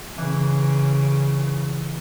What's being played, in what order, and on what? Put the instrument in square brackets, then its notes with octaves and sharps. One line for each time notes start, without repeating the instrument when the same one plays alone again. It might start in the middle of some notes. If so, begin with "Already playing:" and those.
[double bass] C#3 [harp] E3